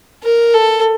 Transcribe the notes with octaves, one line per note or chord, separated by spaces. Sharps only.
A#4
A4